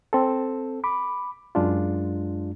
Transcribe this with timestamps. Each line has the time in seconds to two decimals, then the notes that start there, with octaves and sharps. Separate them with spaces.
0.13 C4 A4
0.84 B5 D6
1.55 F#2 G#3 D4 F4